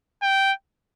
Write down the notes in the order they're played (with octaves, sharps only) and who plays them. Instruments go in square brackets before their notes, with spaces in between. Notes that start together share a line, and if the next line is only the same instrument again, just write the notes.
[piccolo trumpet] G5